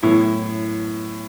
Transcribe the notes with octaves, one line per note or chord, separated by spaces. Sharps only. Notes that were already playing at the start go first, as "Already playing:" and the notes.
F#2 A2 E3 B3 E4